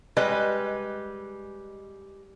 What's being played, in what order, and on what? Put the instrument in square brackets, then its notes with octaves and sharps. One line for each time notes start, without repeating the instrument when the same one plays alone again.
[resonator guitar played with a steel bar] G3 G#3 B4 D#5